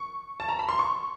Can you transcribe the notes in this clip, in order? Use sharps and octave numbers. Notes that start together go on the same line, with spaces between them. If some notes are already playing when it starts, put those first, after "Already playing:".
Already playing: C#6
A5
A#5
B5
C6
C#6